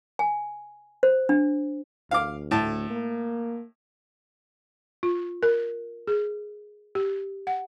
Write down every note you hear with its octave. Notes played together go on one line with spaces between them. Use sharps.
G#5
C5
D4
D2 F5 D6
A2 A5
A#3
F4
A#4
G#4
G4
F#5